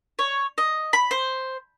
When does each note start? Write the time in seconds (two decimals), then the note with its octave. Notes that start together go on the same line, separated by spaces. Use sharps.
0.19 C#5
0.58 D#5
0.93 B5
1.11 C5